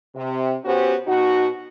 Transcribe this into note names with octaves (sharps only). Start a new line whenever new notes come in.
C3
B3 C#4 F#4 G4 C5
B2 D#4 F#4